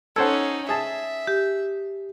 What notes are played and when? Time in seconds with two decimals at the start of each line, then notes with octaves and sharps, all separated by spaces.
0.16 C#4 D#4 A4 C5 F#5 G#6
0.69 G#4 E5 A5
1.27 G4